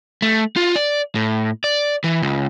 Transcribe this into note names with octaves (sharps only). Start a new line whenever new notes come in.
A3
F4
D5
A2
D5
E3
C#2